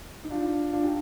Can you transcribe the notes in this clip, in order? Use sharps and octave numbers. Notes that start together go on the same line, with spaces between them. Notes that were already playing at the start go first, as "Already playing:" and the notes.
D#4
D4 F4
D4 F4
D#4 G4